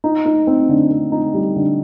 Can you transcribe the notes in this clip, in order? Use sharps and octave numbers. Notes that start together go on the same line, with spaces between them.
D#4
D#4
C4
D3
C4
D#4
G3
D3